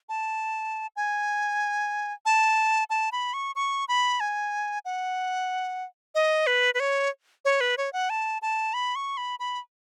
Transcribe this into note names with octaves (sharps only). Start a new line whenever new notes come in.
A5
G#5
A5
A5
B5
C#6
C#6
B5
G#5
F#5
D#5
B4
B4
C#5
C#5
B4
C#5
F#5
A5
A5
B5
C#6
B5
B5